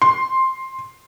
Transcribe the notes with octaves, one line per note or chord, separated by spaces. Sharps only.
C6